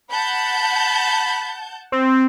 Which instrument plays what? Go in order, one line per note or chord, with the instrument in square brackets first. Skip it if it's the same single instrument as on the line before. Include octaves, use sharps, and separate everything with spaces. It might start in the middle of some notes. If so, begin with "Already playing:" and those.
[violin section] F#5 A5 G6 [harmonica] B5
[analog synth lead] C4